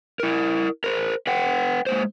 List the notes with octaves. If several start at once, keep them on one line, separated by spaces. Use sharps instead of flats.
E4 A#4
A#4 C5
B4 F#5 G5
G#3 A#3 C5